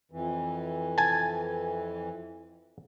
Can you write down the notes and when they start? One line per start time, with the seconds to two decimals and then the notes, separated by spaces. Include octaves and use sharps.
0.12 F2 E3
0.98 G#5 A5